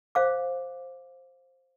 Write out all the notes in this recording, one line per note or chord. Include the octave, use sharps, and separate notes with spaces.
C5 F5 D6